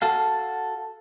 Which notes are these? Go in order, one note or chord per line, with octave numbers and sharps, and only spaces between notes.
F#4 A4 F5